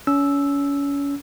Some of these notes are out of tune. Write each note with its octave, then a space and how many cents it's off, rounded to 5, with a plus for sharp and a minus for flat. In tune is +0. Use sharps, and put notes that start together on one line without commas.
C#4 +30 E6 +0